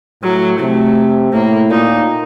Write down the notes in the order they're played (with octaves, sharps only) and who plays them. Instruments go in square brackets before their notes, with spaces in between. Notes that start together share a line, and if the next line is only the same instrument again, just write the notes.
[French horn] A2 [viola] F#3
[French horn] C3 [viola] A3
[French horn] A2 [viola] A#3
[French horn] A#2 [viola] D#4